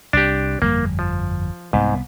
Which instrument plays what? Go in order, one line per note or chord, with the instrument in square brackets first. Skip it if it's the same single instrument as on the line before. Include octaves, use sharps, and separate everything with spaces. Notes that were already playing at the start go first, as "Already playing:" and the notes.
[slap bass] C2 [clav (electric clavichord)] D4 G4
[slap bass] G1 F2 G3 [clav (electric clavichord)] A#3
[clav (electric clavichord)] F3
[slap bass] C2 B3 [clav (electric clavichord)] G#2